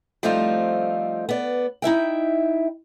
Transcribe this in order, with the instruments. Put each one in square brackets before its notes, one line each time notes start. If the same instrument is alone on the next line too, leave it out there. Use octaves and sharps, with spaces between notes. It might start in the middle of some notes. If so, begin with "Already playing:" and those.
[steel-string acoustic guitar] F3 G3 A3 C4 D#4 F4
B3 D5
D#4 E4 E5 G5